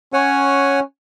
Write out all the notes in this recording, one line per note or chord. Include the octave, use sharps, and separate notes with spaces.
C#4 C#5 F#5 G#5